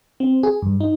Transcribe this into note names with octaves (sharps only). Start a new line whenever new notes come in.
C4
G#4
G2
D#4